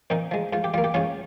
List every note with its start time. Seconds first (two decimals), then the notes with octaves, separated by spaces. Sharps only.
0.10 A#2 C4 D#4
0.31 F3 G#3
0.53 G#2 F4
0.64 G4
0.74 G3 A#3 F4
0.84 G4
0.94 G#2 C#4 F4